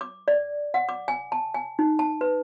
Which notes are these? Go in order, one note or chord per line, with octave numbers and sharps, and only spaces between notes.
D6
D5
F#5
D6
G#5
A5
G#5
D#4
A5
B4